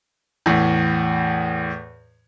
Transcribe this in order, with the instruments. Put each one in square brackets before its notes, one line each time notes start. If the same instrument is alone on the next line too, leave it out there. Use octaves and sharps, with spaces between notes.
[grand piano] E2 A2